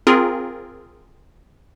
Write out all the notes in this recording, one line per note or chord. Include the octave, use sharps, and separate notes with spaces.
C4 F4 G#4 A#4